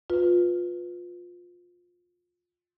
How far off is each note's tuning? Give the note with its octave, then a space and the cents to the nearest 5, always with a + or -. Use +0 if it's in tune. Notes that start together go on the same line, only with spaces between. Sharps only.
F4 +20 B4 +0